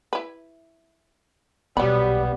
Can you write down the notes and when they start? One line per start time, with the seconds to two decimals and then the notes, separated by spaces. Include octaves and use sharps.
0.13 E4 B4
1.77 D#1 B1 F#3 G3 B3 B5